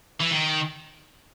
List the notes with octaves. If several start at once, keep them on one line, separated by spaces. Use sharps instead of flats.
E3
D#3